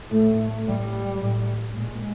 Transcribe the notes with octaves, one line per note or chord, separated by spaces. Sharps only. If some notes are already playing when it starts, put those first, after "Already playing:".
A2 A3
A2 G3
A2
A#2 G#3